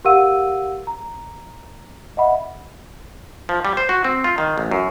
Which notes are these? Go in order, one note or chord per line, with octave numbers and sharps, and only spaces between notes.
G4 A#4 F5 F#5 E6 D#7
A#5
D#5 E5 F#5 B5
F3
G3
C5
F#4
C4
F4
D#3
A1
F#2